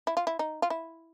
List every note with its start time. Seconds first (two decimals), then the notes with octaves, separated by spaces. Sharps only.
0.07 E4
0.17 F4
0.27 E4
0.39 D#4
0.62 F4
0.70 E4